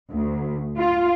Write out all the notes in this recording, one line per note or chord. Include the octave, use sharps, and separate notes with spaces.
D2
F4